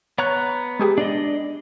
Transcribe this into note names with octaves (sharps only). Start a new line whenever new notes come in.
B3 C#5 A#5 F#6
G#3 G4 G#4
D4 D5 D#5